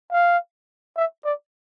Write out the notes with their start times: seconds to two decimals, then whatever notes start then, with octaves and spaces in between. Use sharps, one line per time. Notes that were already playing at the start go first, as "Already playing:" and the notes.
0.12 F5
0.97 E5
1.25 D5